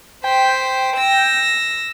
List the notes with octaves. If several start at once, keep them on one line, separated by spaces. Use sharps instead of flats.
C5 G5 B6
E6 A#6